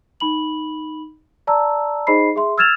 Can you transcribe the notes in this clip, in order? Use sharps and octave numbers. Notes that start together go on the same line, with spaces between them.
D#4 B5 F#7
D5 A5 A#5 E6
D#4 G#4 C5 D#5 B5 C7
G#4 E5 C6
E6 F6 G#6 A6 E7 F7